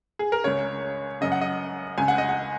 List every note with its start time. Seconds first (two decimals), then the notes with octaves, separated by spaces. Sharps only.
0.19 G#4
0.32 A#4
0.44 C#2 C#3 C#5
1.21 F#2 C#3 D#5
1.32 F#5
1.41 D#5
1.98 C#2 C#3 G#5
2.08 F#5
2.18 D#5
2.29 F#5